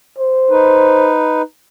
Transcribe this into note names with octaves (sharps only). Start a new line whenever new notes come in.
C5
D#4 B4